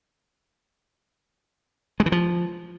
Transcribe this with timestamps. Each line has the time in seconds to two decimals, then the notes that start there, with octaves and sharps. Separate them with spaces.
2.00 G#3
2.06 E3
2.12 F3